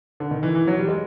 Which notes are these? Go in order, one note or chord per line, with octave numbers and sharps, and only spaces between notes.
D3
D#3
E3
E3
F#3
G3
G#3